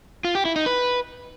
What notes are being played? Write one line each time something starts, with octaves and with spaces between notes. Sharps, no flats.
F4
G4
E4
D#4
B4